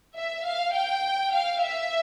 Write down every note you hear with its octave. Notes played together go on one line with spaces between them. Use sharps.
E5
F5
G5
F5
E5